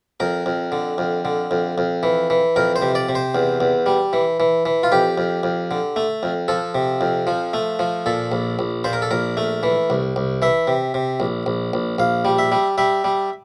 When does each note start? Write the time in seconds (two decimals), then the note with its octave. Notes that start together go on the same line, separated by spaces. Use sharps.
0.20 F2 A#4
0.46 F2
0.72 D3
0.98 F2
1.25 D3
1.51 F2
1.78 F2
2.03 E3
2.30 E3
2.56 F2 A#4
2.76 C5
2.82 C3
2.95 D5
3.09 C3
3.15 C5
3.35 E2
3.60 E2
3.86 G3
4.13 E3
4.40 E3
4.66 E3
4.83 F4
4.92 F2 G4
5.18 F2
5.43 F2
5.71 D3
5.96 A3
6.23 F2
6.48 F3 A4
6.75 C3
7.01 F2
7.27 F3
7.53 A3
7.79 F3
8.06 A#2 A4
8.32 A#1
8.59 A#1
8.84 A#2 C5
8.93 A#4
9.02 A4
9.11 A#1 A#4
9.37 A3
9.63 E3
9.90 C2
10.16 C2
10.42 E3 E5
10.67 C3
10.94 C3
11.20 A#1
11.46 A#1
11.73 A#1
11.98 A#1 F5
12.25 G3
12.38 E5
12.52 G3
12.78 G3 E5
13.04 G3